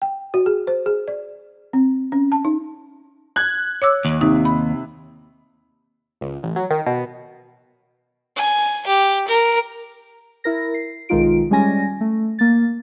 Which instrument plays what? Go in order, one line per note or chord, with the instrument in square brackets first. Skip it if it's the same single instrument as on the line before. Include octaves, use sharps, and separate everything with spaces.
[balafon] G5
F#4
G#4
C5
G#4
D5
C4
C#4
A5
D#4
[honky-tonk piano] F#6 G#6
[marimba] C#5 D6 E6
[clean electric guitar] D#2
[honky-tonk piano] C3 [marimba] D#4
[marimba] B5
[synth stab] C#2
A1
F#3
D#3
B2
[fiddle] G#5
G4
A#4
[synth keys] E4 A#4 A#6
C7
B1 D#3 G#3 D#4 F4 D7
G3 G#3 C#4 G#5 A#6
A3
A#3 A6